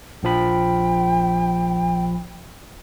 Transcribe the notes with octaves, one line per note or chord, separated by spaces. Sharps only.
A#1 F3 G5 B5